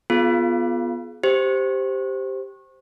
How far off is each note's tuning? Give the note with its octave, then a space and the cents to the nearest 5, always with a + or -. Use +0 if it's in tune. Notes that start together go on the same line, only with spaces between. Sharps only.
B3 +0 F4 +0 G#4 +35
G4 +0 C5 +0